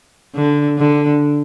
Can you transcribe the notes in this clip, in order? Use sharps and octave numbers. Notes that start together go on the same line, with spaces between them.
D3
D3